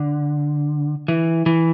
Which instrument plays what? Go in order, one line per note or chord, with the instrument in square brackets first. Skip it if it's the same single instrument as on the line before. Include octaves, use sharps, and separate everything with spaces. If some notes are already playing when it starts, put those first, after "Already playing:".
Already playing: [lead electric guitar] D3
E3
E3